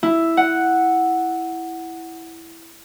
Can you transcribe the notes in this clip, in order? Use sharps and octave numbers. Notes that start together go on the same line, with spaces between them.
E4
F#5